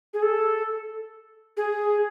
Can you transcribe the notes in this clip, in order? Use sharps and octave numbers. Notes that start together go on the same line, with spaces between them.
G#4
A4
G#4